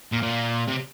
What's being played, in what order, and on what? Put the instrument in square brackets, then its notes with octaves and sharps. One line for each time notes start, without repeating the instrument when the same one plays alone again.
[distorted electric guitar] A#2
A#2
C3